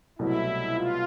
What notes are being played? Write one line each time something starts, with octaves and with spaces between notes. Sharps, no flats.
C2 B2 F#3 A3 E4
F4